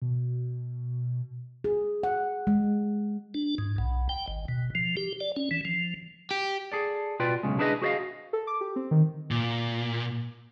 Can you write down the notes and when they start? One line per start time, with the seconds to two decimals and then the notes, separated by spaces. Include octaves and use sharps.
0.02 B2
1.64 G#4
2.03 F#5
2.47 G#3
3.34 D4
3.58 G#2
3.78 B1
4.09 G5
4.28 G#1
4.48 B2
4.75 F3
4.97 G4
5.20 D5
5.36 C#4
5.51 E3
5.65 F3
6.31 G4
6.72 G#4 A4 D5
7.20 B2 F4 B4 D5 G5
7.43 B1 G#2 C#3 G#3
7.59 D4 E4 G#4 B4 C#5 D#5
7.82 F#4 G#4 C5 D5 D#5 F5
8.33 A4
8.47 D6
8.61 G4
8.76 C4
8.91 D#3
9.31 A#2